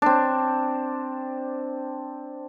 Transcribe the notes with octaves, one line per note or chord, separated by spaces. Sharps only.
C4 D4